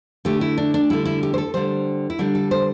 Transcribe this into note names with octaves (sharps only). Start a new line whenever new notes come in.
D3 A3 G4
E4
D4
D4
D3 G3 E4
E4
G4
C5
A4
D3 G3 C5
E4
D3 G3 D4
A4
C5